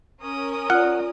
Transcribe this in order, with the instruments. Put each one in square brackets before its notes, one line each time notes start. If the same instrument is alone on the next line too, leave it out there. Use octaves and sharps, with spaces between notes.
[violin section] C#4 A#4 D#6
[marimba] F4 D5 [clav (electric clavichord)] F#5